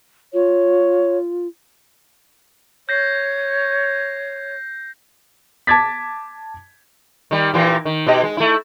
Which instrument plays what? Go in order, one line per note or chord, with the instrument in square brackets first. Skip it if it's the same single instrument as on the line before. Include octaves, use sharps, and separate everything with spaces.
[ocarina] F4 [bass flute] C#5
[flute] C#5 [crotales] G6 A#6 C7
[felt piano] A5 D6 G#6 A6 B6
[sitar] D#3 G3
A#2 E3 G4
D#3
B2 G4 D#5
G#3
A3 E4